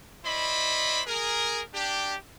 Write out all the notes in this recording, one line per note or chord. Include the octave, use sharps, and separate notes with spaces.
E4 C5 D5 D#5 B5
G#4 A#4
D4 G4